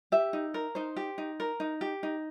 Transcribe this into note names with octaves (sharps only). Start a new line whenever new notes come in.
G4 E5
D#4
A#4
D#4 C5
G4
D#4
A#4
D#4
G4
D#4